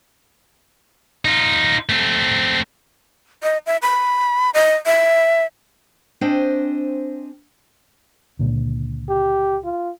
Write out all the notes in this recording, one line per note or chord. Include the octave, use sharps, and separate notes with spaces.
D#4 F4
A3 C4
D#5
E5
B5
D#5
E5
C4 D4 C5 D#5 G5 G#5
C#2 A#2 D3
G4
F4